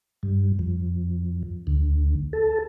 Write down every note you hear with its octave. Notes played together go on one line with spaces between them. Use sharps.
G2
F2
D2
A4